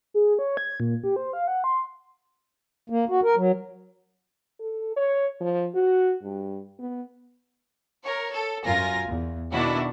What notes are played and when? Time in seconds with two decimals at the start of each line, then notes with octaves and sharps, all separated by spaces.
0.14 G#4
0.39 C#5
0.57 G#6
0.80 A#2
1.04 G4
1.16 C5
1.33 F5
1.47 F#5
1.64 C6
2.90 A#3
3.09 F#4
3.24 A#4
3.36 F#3
4.60 A4
4.96 C#5
5.41 F3
5.75 F#4
6.23 G2
6.79 B3
8.04 A#4 C#5
8.33 A4
8.66 F#2 F4 A#4 G#5 A#6
9.07 E2
9.53 B2 D#3 D4 E4 F#4